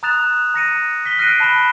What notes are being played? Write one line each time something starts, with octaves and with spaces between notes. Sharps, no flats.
A#5 D#6 F#6 A6 E7 F7
A#5 A#6 C#7 D#7
B6 G7
F6 F#6 A#6 C7 D7 D#7
A5 B5 E7 G7